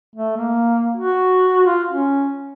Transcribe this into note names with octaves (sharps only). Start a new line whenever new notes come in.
A3
A#3
F#4
F4
C#4